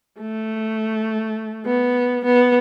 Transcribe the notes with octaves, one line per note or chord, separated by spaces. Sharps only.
A3
B3
B3